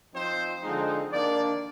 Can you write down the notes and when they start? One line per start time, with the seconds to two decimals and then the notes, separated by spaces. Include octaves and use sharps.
0.14 F3 C4 D#4 C5
0.63 D3 F3 G#3 C4 D#4
1.12 D#3 A#3 D4 D5